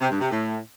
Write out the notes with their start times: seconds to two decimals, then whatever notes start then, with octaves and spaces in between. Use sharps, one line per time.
0.01 C3
0.11 G2
0.21 C3
0.31 A2